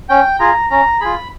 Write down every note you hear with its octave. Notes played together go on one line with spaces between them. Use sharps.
C#4 G5
F4 G#4 A#5
C#4 A#5
F4 G#4 B5